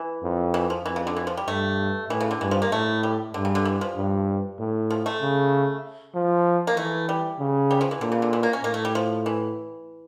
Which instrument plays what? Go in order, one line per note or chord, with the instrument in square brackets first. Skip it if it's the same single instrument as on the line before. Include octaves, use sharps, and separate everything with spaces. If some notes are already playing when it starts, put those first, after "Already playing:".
Already playing: [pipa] E3
[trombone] F2
[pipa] E3
F3
[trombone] F2 [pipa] E3
[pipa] C#3
D3
E3
F3
G3
[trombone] G2 [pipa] A3
[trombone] A2 [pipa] E3
[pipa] C#3
D3
[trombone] G2 [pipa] E3
[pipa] F3
A#3
[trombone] A2 [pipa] A3
[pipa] G3
[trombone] G2 [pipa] D3
[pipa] C#3
D3
E3
F3
[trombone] G2
A2
[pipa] F3
A3
[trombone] C#3
F3
[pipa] A#3
[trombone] E3 [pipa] A3
[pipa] G3
[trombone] C#3
[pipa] G3
F3
E3
[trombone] A#2 [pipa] D3
[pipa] C#3
D3
E3
A#3
C#4
[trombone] A2 [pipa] A#3
[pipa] A3
G3
F3
E3